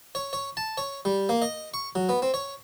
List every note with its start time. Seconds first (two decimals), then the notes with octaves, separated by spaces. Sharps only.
0.15 C#5
0.33 C#5
0.57 A5
0.78 C#5
1.05 G3
1.29 A#3
1.42 D#5
1.74 C#6
1.95 F#3
2.09 B3
2.22 C4
2.34 C#5